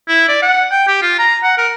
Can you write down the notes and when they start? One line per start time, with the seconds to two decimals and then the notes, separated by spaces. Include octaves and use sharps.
0.08 E4
0.28 D5
0.42 F#5
0.71 G5
0.88 G4
1.02 F4
1.19 A#5
1.43 F#5
1.58 A#4